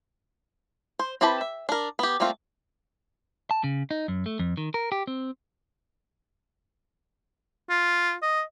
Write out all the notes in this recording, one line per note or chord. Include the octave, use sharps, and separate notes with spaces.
C5
C4 E4 G4 B4 A5
E5
D4 A#4
B3 G4
G3 A3 A#3 C4 F4
A5
C#3
D#4
F#2
A3
F2
D#3
A#4
G4
C4
F4
D#5